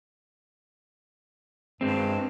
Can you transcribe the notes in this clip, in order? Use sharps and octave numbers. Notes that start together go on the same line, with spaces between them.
G2 G#3 C4